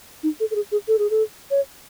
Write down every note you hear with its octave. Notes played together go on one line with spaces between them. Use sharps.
D#4
A4
A4
G#4
G#4
A4
G#4
A4
C#5